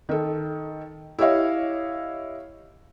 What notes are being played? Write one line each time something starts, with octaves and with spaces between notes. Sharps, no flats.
D#3 A4
E4 G4 C#5 D#5 F5